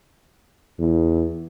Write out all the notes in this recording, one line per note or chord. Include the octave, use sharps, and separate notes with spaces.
E2